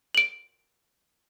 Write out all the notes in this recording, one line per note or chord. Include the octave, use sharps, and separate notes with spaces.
D7 F#7